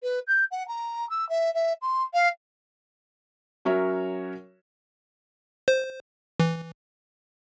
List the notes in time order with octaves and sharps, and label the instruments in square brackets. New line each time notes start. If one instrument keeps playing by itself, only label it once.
[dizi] B4
G6
F#5
A#5
E6
E5
E5
C6
F5
[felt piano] F#3 C#4 F#4 A#4 C#5 E5
[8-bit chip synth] C5
E3